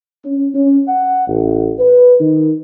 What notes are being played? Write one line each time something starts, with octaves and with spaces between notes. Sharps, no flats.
C#4
C#4
F#5
A1
B4
D#3